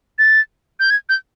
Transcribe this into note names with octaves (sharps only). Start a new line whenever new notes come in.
A6
G6
G#6
G6